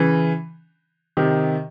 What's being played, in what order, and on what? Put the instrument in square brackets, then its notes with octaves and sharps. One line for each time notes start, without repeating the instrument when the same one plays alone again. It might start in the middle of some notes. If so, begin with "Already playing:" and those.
Already playing: [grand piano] C#3 E3
C3 D#3